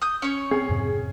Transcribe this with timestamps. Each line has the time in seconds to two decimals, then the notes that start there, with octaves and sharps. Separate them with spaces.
0.02 D#6 G6
0.22 C#4 C#5
0.51 C4 G#4
0.69 F2 G#2 C3